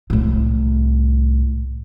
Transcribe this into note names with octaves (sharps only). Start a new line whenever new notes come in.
C2 A2